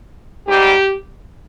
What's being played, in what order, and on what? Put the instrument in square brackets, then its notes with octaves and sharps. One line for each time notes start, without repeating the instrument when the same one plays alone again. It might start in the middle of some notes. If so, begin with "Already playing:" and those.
[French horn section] G#2 G3 G4